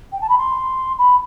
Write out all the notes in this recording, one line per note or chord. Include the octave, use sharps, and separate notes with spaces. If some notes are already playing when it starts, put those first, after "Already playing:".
G5
A5
B5
C6
B5